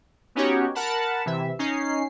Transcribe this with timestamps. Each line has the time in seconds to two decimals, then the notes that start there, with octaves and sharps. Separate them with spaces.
0.35 B3 C#4 D#4 F#4 G4 C#5
0.75 A#4 F#5 A5 B5
1.25 C3 E3 E5
1.59 C#4 D#4 C7